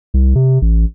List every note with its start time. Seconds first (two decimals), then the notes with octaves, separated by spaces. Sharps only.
0.14 C2
0.35 C3
0.62 A1